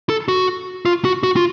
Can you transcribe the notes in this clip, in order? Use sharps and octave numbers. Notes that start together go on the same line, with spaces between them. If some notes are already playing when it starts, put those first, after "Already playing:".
A4
F#4
F4
F#4
F#4
F4